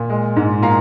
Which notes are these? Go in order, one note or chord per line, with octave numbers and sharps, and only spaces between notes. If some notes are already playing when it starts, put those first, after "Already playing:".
Already playing: A#2
G#3
G#2
A#2 F5 A#5